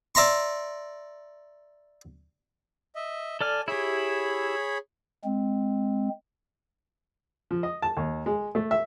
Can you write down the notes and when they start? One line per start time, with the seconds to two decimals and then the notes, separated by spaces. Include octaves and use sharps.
0.15 D5 E5 A#5 C6 C#6
2.95 D#5 E5
3.41 A4 D5 G#5 F6
3.68 E4 G4 G#4 C#5 B5
5.24 G#3 C4
7.51 F3
7.63 D#5
7.82 A5
7.97 D#2
8.26 G#3
8.55 A3
8.71 E5